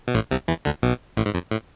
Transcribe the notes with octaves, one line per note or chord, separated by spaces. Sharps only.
B2
A1 A2
C2 C3
E2 E3
D2 D3
B1 B2
A1 A2
G#2
F2
A2